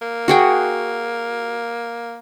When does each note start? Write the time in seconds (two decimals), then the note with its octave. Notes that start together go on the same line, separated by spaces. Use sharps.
0.02 A#3
0.28 F#4 G#4 G5